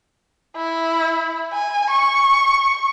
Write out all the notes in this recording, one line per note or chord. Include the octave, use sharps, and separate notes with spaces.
E4
G#5
C#6